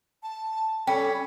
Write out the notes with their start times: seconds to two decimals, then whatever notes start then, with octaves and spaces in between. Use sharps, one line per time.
0.23 A5
0.87 G3 C#4 A4 G5 B5